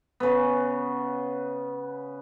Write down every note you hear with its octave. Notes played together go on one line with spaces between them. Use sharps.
C#3 B3